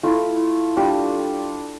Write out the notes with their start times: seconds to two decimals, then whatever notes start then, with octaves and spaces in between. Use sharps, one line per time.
0.03 A3 E4 F4
0.77 G3 D4 F4 G4